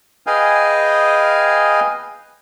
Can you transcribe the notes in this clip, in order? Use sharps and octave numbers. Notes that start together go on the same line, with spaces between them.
G#4 B4 D#5 F5 G5 G#5